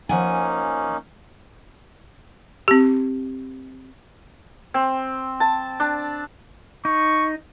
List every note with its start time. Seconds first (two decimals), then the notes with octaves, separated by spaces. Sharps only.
0.09 F3 A#3 C#4 D#4 F#5 G#5
2.68 C4 G4
4.74 C4
5.40 A5
5.80 D4
6.85 D#4 C#6